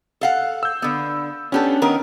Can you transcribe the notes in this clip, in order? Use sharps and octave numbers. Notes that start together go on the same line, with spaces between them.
A4 F5 F#5
E6 G6
D3 B3
B3 C#4 D4 G4 A4
D#3 B3 A#4